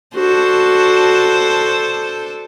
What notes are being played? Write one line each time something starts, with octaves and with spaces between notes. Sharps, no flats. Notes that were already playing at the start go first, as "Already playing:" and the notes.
D4 F#4 A4 C5